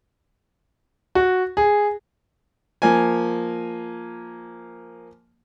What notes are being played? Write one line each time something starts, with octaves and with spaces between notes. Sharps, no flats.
F#4
G#4
F3 A#3 G#5